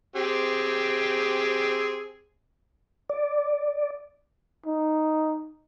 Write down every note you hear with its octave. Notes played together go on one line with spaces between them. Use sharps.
C4 G4 G#4
D5
D#4